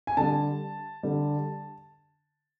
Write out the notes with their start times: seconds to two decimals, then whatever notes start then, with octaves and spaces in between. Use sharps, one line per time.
0.07 G#5
0.17 D3 G3 A5
1.03 D3 G3